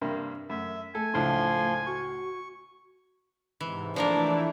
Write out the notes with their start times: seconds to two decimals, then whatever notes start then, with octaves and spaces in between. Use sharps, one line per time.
0.01 G2 C3 A#3
0.50 F#2 A3 E5
0.95 A3 A4 G#5
1.14 C#2 A2 F3 D4 C6
1.86 F#4 C#6
3.61 G#2 C3 E3
3.96 E3 F3 A3 A#3 D4 E4 A#4